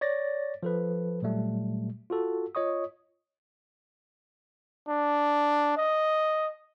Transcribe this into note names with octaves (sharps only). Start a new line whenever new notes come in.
C#5 D5 A6 A#6
F3 A4 B4
A#2 F#3 G3 A3
F4 F#4 A4
F4 C#5 D#5 C#6 D#6
D4
D#5